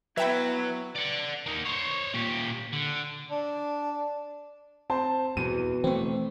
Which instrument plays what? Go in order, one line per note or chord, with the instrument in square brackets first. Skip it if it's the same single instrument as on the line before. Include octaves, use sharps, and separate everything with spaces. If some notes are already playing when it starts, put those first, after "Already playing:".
[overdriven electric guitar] F#3 [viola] B3 E4 [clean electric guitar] B4 [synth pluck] E5 G5 B5
[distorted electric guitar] D5 F#5
A#3 D#4
C5 C#5
A#2 G4
D3
[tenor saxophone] D4
[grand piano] C4 C5 A5
[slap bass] E2 [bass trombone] B2 [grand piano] D#7
[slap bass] E3 A3 [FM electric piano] C4